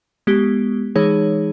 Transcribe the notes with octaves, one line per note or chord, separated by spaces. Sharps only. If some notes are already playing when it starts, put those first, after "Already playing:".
G#3 B3 G4
E3 G#3 D#4 G#4 C#5